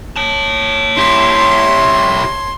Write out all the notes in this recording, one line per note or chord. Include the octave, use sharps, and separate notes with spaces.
C#5 A5
E4 G4 C6